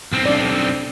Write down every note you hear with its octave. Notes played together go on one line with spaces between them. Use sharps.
B1 C4
D4 D5